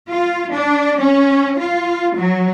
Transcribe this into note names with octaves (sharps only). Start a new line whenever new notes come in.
F4
D4
C#4
F4
F#3